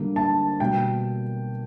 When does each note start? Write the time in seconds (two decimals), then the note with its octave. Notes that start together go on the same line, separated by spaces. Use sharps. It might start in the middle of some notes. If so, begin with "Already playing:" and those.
Already playing: D3 G3 A#3
0.16 A5
0.60 B2 G3 A#3 G5